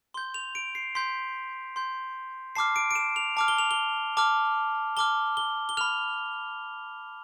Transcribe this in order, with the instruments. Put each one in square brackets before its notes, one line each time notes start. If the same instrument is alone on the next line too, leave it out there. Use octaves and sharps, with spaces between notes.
[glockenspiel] C6 G7
G6
F7
D7
C7
C6 G6 B6
C6 G6
A5 D6 F6 C7
D7
D7
E7
F7
A5 D6 F6
G7
F7
G7
A5 D6 F6
A5 D6 F6 G7
G7
G7
B5 F6 F7